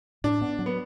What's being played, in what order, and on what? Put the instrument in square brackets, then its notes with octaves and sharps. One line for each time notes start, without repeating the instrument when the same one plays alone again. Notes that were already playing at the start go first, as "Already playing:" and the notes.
[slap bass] A2 [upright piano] D4
[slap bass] B3
F#3
[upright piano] B3